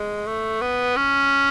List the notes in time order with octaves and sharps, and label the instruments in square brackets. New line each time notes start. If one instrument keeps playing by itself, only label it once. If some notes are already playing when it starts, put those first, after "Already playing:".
Already playing: [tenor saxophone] G#3
A3
B3
C#4